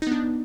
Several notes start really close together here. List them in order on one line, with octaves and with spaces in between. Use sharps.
D#4 B3 D4